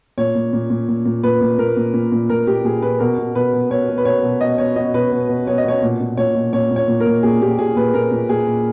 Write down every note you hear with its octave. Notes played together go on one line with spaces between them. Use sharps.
A#2 C#5
A#2
A#2
A#2
A#2
A#2
A#2 B4
A#2
A#2 A#4
A#2
A#2
A#2
A#2 A#4
A#2 G4
A#2 G#4
A#2 B4
B2 A#4
B2
B2 B4
B2
B2 C#5
B2
B4
B2 C#5
B2
B2 D#5
B2 C#5
B2 D#5
B2 B4
B2
B2
B2 C#5
D#5
B2 C#5
A#2
A#2
A#2 C#5
A#2
A#2 C#5
A#2
C#5
A#2
A#4
A#2
A#2 G#4
A#2 G4
A#2 G#4
A#2 B4
A#2 A#4
A#2
A#2 G#4
A#2